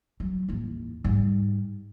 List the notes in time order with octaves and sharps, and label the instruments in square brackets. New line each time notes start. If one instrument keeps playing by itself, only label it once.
[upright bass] F#3
A1 D#2
G#2 G3